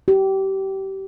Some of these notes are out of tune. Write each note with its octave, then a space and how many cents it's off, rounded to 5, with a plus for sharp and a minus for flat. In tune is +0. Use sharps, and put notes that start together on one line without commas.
G4 -25